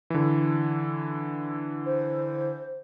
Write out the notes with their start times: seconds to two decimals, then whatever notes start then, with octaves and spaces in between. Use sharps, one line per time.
0.10 D3 E3
1.85 C5